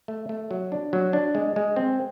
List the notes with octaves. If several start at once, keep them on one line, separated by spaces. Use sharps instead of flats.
A3
A3
F#3
D4
F#3
D4
G#3
G#3
C4